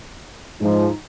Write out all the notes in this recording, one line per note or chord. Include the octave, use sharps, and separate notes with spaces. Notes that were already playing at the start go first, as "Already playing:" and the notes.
G#2 F3 G#3 D#4